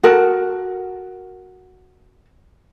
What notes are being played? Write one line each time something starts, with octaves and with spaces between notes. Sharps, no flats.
F#4 A#4 A5